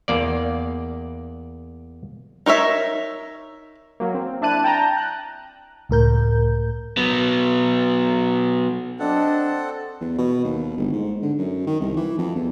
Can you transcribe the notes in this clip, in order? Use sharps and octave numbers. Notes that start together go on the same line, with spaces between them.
E2 A#3 D5
D#4 A#4 C#5 E5
F#3 A#3
C4
D4 E4 A5 F#6 D#7
G5 A5 A#5 G6
F#6
C#2 A2 A#4 G6
F#3 B3
C4 D4 A4 D#5 F#5
E2
B2
D#2
G1
G#2
D3
F#2
D#3
C2
E3
F2
E2